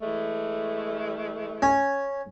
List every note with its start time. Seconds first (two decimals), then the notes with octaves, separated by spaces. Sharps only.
0.02 E3 G#3 A3
1.62 C#4